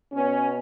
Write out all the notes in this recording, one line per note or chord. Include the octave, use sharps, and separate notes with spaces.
B2 B3 C#4